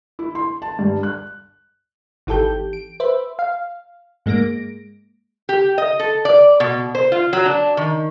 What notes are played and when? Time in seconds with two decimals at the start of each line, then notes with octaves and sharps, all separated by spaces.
0.19 E4
0.35 C6
0.62 A5
0.79 G2
1.03 F#6
2.27 G#1 E3 G4 A4 G6
2.73 D7
3.00 B4 C5 E5
3.39 F5
4.26 G#2 G#3 A#3 A#6 D7
5.49 G4
5.78 D#5
5.99 A4
6.25 D5
6.60 B2
6.95 C5
7.12 F4
7.33 F#3
7.46 D4
7.77 D#3